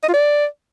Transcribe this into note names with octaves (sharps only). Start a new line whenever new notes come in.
D#5
F4
D5